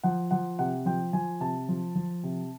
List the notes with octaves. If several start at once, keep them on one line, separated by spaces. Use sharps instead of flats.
F3 F#5
F3 F#5
C3 F#5
F3 G5
F3 G#5
C3 A5
F3
F3
C3